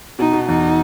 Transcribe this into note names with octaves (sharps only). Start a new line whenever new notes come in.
B2 D#4
B2
E2 D#4